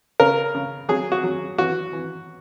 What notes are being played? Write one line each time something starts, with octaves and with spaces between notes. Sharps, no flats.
C#3 A#4
C#3
F#3 G#4
F#4
F#3
E3 F#4
E3